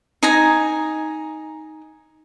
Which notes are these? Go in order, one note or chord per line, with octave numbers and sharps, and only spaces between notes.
D#4 G#5 A#5